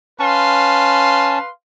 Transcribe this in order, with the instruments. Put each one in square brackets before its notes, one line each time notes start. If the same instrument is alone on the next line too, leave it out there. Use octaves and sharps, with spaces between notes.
[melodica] C#4 A5 [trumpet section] B4 F5 C6